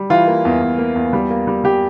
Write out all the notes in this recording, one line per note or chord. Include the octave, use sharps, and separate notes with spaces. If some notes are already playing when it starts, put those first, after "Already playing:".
Already playing: G3
E3 F4
A#3
E2
E2
A#3
E2
G3
A#3
G3
G3 G4